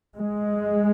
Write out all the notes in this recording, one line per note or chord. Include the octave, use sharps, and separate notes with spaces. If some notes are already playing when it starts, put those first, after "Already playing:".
G#3